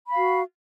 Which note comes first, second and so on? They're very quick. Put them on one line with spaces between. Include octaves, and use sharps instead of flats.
B5 F5 F#4